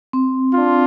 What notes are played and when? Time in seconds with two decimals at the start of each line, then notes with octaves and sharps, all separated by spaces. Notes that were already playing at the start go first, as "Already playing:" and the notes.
0.13 C4
0.54 D4 F4